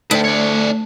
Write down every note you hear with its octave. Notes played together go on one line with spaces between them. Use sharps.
D2 A3 B4 G5
D4 C#5